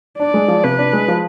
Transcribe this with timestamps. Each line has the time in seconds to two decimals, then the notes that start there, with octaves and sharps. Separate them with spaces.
0.19 D4 D5
0.34 G#3
0.48 F3
0.64 C3 B4
0.79 D4
0.93 G#3
1.08 F3